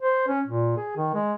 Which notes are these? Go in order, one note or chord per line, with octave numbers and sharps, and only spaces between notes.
C5
C#4
A#2
G#4
D#3
G#3